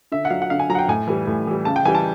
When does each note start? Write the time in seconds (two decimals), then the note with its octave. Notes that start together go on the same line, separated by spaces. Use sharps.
0.12 D3 E5
0.25 F#5
0.30 F#3 F5
0.42 F#5
0.50 D3 F5
0.59 G#5
0.69 F#3 A#5
0.75 F#5
0.79 G5
0.88 A2 G#5
1.07 E3 G3
1.27 A2
1.47 E3 G3
1.65 C#3 A5
1.76 G5
1.85 E3 G3 G#5
1.95 A5